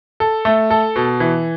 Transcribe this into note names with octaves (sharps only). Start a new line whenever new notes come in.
A4
A3
A4
B2
E3